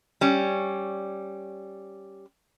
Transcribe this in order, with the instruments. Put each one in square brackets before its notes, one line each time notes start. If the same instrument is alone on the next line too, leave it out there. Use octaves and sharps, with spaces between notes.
[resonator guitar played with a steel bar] G3 C#4